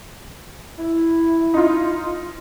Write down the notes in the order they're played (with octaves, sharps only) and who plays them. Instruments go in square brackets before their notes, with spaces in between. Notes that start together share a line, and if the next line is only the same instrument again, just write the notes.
[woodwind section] E4
[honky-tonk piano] D#4 F4